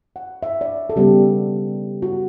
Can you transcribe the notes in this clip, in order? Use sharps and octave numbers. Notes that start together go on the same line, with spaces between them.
F#5
E5
D5
A4
C#3 G3 B3 G4
F#4